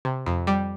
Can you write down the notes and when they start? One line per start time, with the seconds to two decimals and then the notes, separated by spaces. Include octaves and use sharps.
0.05 C3
0.26 F2
0.47 G3